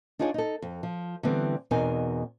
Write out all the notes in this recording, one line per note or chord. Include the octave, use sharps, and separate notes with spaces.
D4 D#4 F4 G#4 C#5
D#4 A4
F2
F3
D3 E3 G3 B3 C4
E2 B2 C4 D#4 A#4 G#5